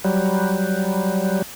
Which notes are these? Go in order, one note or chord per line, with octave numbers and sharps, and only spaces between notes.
F#3 G3